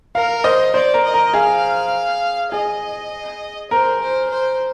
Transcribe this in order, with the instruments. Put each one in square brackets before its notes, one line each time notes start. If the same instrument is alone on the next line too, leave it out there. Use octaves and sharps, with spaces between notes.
[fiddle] A#4 [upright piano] F5
[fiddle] C5 [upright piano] D#5
[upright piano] C5 [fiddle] D5
[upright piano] A#4
[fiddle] D#5
[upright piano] A#4
[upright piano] G#4 [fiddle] F5
[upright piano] G#4 [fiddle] D#5
[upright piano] A#4 [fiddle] C5
[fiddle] C5
C5